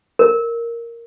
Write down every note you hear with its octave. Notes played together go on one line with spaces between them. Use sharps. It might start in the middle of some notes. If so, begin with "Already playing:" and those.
A#4